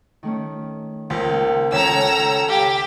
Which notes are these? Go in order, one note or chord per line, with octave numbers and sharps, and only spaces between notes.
D#3 A3 C#4
C#2 A#3 C5
C#2 C#4 A4 A#5 E6
G4 F5